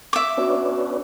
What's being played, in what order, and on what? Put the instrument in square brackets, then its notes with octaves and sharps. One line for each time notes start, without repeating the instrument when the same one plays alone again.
[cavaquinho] E5 D6
[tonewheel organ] B3 C#4 D4 [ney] F#4